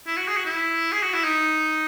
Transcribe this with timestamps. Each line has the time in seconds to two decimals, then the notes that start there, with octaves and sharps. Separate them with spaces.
0.07 E4
0.17 F#4
0.27 G#4
0.36 F#4
0.46 E4
0.92 G#4
1.02 F#4
1.13 E4
1.24 D#4